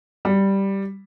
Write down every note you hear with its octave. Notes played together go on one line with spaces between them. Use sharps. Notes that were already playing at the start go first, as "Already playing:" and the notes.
G3